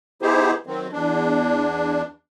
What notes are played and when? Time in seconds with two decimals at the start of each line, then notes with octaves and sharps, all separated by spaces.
0.22 B3 D#4 E4 G4 G#4 C5
0.67 D#3 F#3 C4
0.92 E2 D4